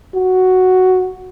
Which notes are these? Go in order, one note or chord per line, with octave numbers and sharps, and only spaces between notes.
F#4